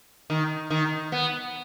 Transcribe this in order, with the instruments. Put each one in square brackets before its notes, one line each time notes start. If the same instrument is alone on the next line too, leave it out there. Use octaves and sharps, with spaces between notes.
[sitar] D#3
D#3
B3